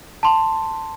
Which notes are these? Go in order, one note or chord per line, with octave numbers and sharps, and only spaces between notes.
A5 C6